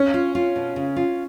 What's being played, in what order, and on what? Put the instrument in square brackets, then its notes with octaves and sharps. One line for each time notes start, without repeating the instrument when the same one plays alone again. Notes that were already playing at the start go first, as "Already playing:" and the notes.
Already playing: [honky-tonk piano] C#4
[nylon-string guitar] F4
F4
B2
C#3
F4